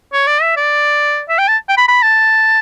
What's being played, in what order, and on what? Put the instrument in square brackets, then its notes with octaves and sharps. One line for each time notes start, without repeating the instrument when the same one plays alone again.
[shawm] C#5
D5
E5
D5
E5
G5
A5
G5
B5
B5
A5